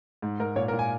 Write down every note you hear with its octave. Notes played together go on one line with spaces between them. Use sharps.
G#2
G#2 A#4
A#2 C#5
A#4
A#2
G#5